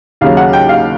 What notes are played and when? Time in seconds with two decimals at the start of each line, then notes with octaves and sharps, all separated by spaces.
0.21 D#2 C#3 F#3 F5
0.37 F#5
0.53 G5
0.69 F5